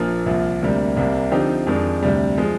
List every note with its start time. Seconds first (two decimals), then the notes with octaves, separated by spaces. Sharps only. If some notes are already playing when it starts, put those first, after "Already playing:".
Already playing: A#1 A#2 F3 A#3
0.26 C2 A#2 F3
0.62 D2 C3 G3 A#3
0.97 C2 C3 G3 A#3
1.31 D3 F3 C4 D#4 G4
1.67 F2 D#3 G#3 D4
2.03 D2 C3 G3
2.38 F3 G#3